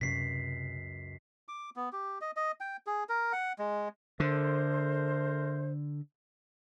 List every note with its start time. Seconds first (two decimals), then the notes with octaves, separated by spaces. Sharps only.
0.01 C#2 F#2 C3 C4 C#4 B6 C7
1.48 D6
1.76 B3
1.93 G4
2.21 D#5
2.36 D#5
2.60 G5
2.87 G#4
3.09 A#4
3.33 F#5
3.59 G#3
4.20 D3 A3 A#4 C5